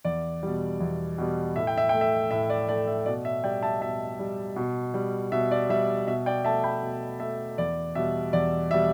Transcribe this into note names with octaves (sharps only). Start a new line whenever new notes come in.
E2 D5
B2 G3
E2
B2 G3
A2 E5
G5
E5
A3 G5
E5
A2 E5
D5
A3 D5
E5
B2 D5
E5
G3 D5 G5
E5 A5
B2 E5 A5
G3
B2
G3
B2 E5
D5
G3 E5
B2 E5
D5 G5
A3 E5 A5
G5 B5
B2
A3 E5
E2 D5
B2 G3 E5
E2 D5
B2 G3 E5